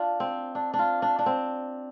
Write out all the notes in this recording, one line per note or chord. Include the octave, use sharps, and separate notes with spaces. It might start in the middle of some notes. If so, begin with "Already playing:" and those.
Already playing: D4 F4
C4
D4
D4
F4
D4
D4
C4